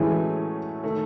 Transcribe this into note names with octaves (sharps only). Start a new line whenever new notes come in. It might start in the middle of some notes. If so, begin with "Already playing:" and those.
Already playing: A2 E3 F#3 G#3 A3 C#4 E4
D#3 A3